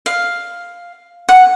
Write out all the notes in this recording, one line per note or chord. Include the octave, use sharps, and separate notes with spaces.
F5
F#5